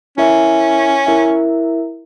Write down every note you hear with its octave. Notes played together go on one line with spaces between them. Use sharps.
C#4 E4 A#4 E5
E4 A#4 E5